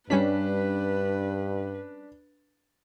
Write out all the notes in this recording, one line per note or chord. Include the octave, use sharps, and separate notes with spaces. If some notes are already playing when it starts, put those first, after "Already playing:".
G2 G3 C#4 D4 B4 B6